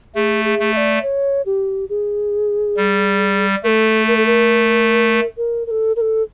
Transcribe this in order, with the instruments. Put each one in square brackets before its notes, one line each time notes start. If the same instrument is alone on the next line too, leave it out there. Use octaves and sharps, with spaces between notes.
[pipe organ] A3 [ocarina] G#4
[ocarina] G#4
[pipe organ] A3
[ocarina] E5
D5
C#5
G4
G#4
[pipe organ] G3
[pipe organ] A3 [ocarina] A#4
[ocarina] A4
A#4
A4
A#4
A#4
A#4
A4
A#4
A4